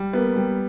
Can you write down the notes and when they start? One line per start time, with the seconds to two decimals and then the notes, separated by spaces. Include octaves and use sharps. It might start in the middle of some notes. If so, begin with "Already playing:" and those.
Already playing: G3
0.13 A#3 B3
0.36 G3